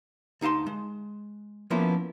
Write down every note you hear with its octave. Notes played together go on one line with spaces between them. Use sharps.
D2 D#4 F5 A5 C6
G#3
F3 A#3 B3 C#4 E4